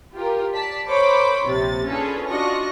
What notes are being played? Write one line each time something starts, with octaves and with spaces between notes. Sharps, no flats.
F4 G4 A#4
D5 A5 B6
A#4 C5 C#5 B5 D6
A#1 C3 A6
C#4 D4 F4 G#4 A4 B4
D4 F4 F#4 D#5 C#6 A#6